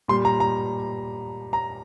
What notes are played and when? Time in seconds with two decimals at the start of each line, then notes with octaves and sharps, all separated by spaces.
0.08 A#2 G3 C6
0.25 A#5
0.40 A#5
1.53 A#5